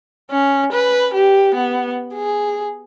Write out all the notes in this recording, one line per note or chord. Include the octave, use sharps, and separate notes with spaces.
C#4
B4
G4
B3
G#4